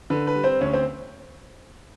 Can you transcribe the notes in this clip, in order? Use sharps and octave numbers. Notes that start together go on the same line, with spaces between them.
D3 B4
B4
G3
C4 C5
D2 C#4 C#5
C4 C5